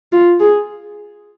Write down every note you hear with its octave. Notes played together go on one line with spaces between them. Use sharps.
F4
G#4